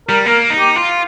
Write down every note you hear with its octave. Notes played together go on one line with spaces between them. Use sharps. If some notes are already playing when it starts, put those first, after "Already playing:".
G3 A#4
A#3 A#4
D#4
G4
F4